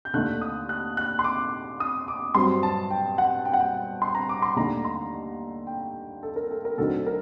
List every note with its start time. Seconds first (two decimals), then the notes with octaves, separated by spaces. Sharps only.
0.05 G6
0.14 D#2 D3 A3 D#4 F#6
0.41 D#6
0.69 F#6
0.97 F#6
1.19 C6
1.24 D6
1.80 D#6
2.08 D6
2.35 G2 F#3 C4 C6
2.63 A5
2.90 G5
3.18 F#5
3.45 G5
3.53 F#5
3.60 G5
4.02 C6
4.15 A#5
4.29 D6
4.42 C6
4.56 D#2 D3 A3 D#4 A#5
4.85 C6
5.67 G5
6.23 A4
6.36 A#4
6.51 A4
6.65 A#4
6.78 D2 D3 F#3 C4 D#4 A4
7.06 A#4